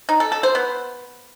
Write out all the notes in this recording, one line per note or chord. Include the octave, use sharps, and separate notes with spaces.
D#4
A4
A4
C5
B3